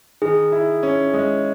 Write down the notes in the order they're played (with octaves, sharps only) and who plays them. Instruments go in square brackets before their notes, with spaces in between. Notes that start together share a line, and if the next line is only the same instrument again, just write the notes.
[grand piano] D#3 [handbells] G#4
[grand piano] E4
C#4
G#3